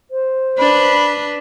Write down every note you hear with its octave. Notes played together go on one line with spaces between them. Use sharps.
C5
D4 B4 B5